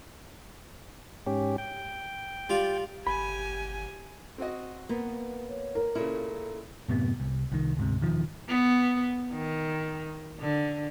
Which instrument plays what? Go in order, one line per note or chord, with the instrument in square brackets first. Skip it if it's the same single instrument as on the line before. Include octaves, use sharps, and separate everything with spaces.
[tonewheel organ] G#2 C#4 G4
G5
[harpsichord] G3 F4
[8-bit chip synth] G1 [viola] G4 G#5 [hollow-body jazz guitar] B5
[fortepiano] C4 F#4 D#5
[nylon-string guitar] A#3 B3
[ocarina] C#5
[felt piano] A#4
[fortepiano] A#2 C#3 [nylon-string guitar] E4 [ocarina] A4
[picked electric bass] F#2 A2 C3 B3
C2
C2 D#3
D2 G#2 C3
E1 D#3 F3
[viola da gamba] B3
D#3
D3